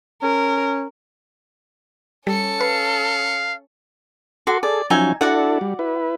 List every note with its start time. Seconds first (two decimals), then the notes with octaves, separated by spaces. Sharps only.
0.23 C#4 A#4
2.27 G3 C#4 A4 C#7
2.61 B4 F5
4.47 F#4 A4 C6 D6
4.63 G#4 A4 D5
4.90 F3 F#3 C#4 D#4 E5 G#5
5.21 D4 E4 F#4 A4 D5 F#5
5.61 G3
5.79 E4 B4